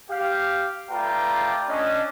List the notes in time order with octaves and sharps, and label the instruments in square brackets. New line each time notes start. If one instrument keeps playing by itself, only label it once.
[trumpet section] G4 F5
A3 F4 B4 D5 G5 A#5
C#4 D4 D#5